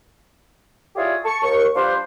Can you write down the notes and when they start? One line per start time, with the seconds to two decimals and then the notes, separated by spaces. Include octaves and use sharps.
0.95 E4 F4 G4 G#4 C#5 D5
1.24 A5 C#6
1.42 D#2 C#6
1.75 G3 D4 F4 B4 C5